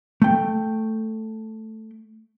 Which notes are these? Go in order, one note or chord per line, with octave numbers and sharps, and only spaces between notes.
A3 G5